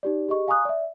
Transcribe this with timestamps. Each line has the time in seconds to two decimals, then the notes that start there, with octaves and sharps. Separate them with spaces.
0.03 D#4 G4 D5
0.29 G4 G#4 D#5 C#6
0.48 F5 G#5 A#5 C#6 D#6 F#6
0.65 D5 E5